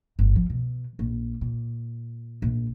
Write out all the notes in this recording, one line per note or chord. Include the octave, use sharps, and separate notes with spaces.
G1
F3
B2
A#1
A#2
A#1